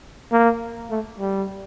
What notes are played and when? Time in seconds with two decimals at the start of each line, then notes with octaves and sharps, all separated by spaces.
0.32 A#3
0.90 A3
1.18 G3